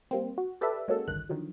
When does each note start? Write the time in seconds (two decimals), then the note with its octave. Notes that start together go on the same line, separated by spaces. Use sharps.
0.11 G3 A#3 C4
0.38 F#4
0.61 G4 A4 B4 D5 E5
0.88 G#3 A#3 C#4 F#4 A4
1.08 A1 D2 G2 D#3 F#6
1.29 D3 D#3 F3 F#3